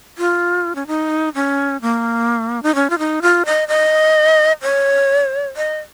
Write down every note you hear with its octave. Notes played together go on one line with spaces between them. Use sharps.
F4
C#4
D#4
C#4
A#3
D#4
C#4
F4
D#4
F4
D#5
D#5
C#5
D#5